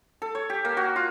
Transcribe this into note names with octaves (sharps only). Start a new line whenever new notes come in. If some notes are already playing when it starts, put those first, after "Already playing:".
A4
C#5
G4
A#3
F#4
F4